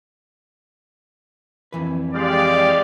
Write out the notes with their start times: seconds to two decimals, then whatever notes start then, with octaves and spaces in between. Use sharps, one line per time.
1.72 F2 E3 B4
2.14 G#3 G4 D5 F5